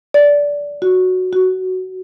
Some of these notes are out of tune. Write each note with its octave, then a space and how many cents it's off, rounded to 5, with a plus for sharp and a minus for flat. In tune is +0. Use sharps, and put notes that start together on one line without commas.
D5 -15
F#4 -5
F#4 +10